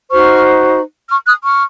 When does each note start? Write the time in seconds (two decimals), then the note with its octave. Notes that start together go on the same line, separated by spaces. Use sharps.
0.11 D#4 F#4 C5 C#6 F6
1.10 C#6 F6
1.27 D#6 F#6
1.43 C#6 F6